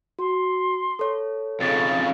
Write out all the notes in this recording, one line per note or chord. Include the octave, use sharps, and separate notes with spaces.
F#4 C6
A4 C#5
F2 C#3 A6